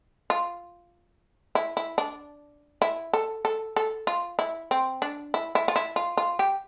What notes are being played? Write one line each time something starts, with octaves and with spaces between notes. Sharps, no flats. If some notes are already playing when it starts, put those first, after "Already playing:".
F4
E4
E4
D4
E4
A4
A4
A4
F4
E4
C4
D4
E4
E4
F4
E4
F4
F4
G4